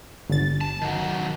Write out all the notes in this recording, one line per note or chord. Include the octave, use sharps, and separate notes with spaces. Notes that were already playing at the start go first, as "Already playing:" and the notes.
G1 A6
A5
D#3 F#3